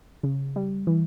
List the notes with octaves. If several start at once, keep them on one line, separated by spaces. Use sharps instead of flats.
C#3
G3
E3